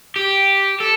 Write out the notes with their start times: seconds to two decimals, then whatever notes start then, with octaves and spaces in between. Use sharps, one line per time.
0.16 G4
0.80 A4